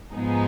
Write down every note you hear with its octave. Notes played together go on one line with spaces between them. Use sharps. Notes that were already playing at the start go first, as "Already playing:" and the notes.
G#2 F3 B3 D#4 G#4